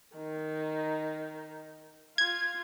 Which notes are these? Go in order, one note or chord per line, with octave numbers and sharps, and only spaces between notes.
D#3 D#4
F4 G#6